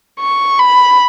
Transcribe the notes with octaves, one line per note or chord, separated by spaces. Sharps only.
C#6
B5